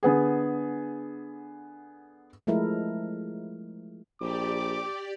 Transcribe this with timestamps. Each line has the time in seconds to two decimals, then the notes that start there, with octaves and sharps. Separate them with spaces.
0.03 D3 B3 G#4
2.47 F3 G#3 A3 E4 A#4
4.21 A#1 G4 D5 D6